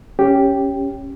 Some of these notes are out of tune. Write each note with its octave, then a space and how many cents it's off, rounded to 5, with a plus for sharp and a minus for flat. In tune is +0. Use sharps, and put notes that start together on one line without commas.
C#4 +0 G4 +0